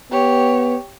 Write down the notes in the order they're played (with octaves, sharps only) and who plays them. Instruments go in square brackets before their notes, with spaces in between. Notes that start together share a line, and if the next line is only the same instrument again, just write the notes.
[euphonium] B3 [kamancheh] G4 C#5